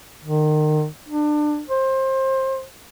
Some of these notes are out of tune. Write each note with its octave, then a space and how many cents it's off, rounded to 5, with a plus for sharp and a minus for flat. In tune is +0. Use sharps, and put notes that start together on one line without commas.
D#3 -30
D4 +25
C5 +20